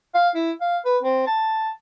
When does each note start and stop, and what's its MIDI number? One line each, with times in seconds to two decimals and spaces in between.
0.14 0.29 77
0.35 0.51 64
0.61 0.78 77
0.85 0.98 71
1.03 1.22 60
1.27 1.70 81